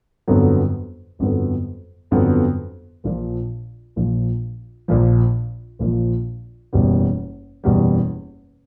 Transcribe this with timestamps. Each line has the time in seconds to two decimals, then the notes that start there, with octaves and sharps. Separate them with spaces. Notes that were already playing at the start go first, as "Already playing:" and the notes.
0.28 G1 F2 D3 F#3 B3
1.19 G1 F2 D3 F#3 B3
2.11 G1 F2 D3 F#3 B3
3.04 A#1 A#2 F3
3.96 A#1 A#2 F3
4.88 A#1 A#2 F3
5.79 A#1 A#2 F3
6.73 F#1 E2 B2 G3
7.64 F#1 E2 B2 G3